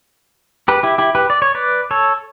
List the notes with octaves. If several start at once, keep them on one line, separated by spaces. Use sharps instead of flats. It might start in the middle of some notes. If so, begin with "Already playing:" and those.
G4 B4
E4 G4
E4 G4
G4 B4
D5
C#5
B4 D5
A4 C#5